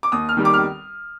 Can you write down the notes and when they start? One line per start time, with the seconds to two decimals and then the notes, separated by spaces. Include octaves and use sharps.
0.03 D6
0.12 D#2 D#6
0.29 F6
0.37 D#3 G3
0.45 D6
0.54 F6